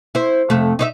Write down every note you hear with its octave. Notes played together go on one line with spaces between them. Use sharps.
E4 C5
F2 C3 A3
D#4 C#5 E5